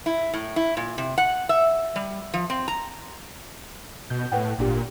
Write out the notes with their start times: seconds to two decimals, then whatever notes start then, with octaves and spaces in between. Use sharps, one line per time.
0.06 E4
0.34 A2
0.56 E4
0.77 A#2
0.98 C3
1.18 F#5
1.49 E5
1.96 G3
2.34 F3
2.50 C4
2.68 A#5
4.10 B2 G6
4.32 A2 B4 F#5 G5
4.58 G#1 A#2 D4 G4